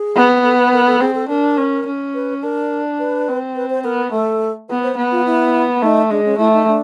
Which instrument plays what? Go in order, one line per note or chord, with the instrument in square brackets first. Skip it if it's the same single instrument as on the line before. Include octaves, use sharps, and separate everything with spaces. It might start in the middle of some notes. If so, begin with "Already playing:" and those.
Already playing: [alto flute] G#4
[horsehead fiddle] B3
[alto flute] A4
B4
A#4
A4
[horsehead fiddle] C4 [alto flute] G#4
[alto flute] A4
[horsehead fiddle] D4 [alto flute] A#4
[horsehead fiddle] C#4
C#4
[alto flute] B4
[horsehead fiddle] D4 [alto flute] A#4
[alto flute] B4
[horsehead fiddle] C4
[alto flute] B4
C5
[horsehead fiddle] B3 [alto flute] A#4
[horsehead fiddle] A3 [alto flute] A4
[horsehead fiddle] B3 [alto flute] B4
[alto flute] C5
[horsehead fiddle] B3
[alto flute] F4
E4
[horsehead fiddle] A3 [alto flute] D#4
[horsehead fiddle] G#3 [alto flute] D4
[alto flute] C#4
[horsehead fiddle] A3 [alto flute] E4
[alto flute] D#4
D4